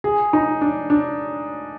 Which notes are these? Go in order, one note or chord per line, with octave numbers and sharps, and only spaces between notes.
G#4
D#4
D4
D4